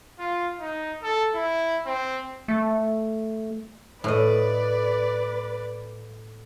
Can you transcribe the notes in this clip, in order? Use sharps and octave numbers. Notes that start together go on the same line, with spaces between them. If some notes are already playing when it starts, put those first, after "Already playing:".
F4
D#4
A4
E4
C4
A3
A2 B4 D5 D#5